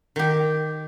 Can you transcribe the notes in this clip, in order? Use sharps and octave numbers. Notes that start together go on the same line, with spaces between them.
D#3 G4